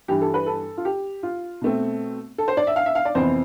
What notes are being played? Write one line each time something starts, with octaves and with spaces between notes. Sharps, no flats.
G2 E3 G3 G4
A4
B4
A4
F4
G4
F4
B2 A3 C4
A4
C5
D5
E5
F5
E5
F5
D5
F2 C3 E3 B3 C5